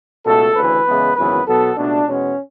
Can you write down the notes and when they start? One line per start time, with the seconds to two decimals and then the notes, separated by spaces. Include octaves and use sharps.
0.25 C#2 B2 A3 A4
0.55 D2 C#3 E3 B4
0.86 E2 C#3 E3 G#3 B3
1.16 G#1 F#2 C#3 E3 B3 B4
1.46 B1 B2 F#3 B3 A4
1.77 C#2 B2 A3 D4
2.07 E2 B2 G#3 B3 C#4